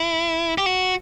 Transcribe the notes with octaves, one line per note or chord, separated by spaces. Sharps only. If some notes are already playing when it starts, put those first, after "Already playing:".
Already playing: E4
G4
F#4